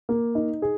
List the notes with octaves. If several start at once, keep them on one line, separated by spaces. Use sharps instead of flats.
A#3
D#4
G#4